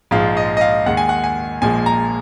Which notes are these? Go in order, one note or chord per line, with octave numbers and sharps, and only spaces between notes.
A#1 G#2 F3 G#3 F5
D#5
D#5
F5
D#2 D#3 G#3 F#5
G#5
F#5
G#5
A#1 A#2 F3 G#3 G#5
A#5